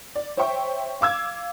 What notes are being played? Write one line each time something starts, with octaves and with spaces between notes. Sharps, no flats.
D5
C5 C#5 E5 G5 C#6
F5 D6 E6 G#6